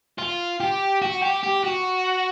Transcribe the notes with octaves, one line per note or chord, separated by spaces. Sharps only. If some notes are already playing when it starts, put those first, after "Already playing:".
F4
G4
F#4
G4
G4
F#4